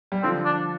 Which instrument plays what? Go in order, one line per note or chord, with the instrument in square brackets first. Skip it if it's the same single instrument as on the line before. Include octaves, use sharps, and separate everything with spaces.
[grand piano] G3
[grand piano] D3 F3 [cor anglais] C4
[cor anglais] D4